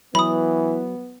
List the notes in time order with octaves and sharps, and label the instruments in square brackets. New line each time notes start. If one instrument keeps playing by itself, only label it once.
[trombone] E3 [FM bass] F#3 [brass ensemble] B3 [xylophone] B5 D#6